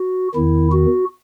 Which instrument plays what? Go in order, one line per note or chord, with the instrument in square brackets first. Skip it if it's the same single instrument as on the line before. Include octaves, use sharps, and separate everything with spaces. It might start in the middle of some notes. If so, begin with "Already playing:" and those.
Already playing: [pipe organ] F#4
E2 D#3 E4
F#4